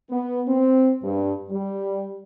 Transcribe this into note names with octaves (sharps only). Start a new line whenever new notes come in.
B3
C4
G2
G3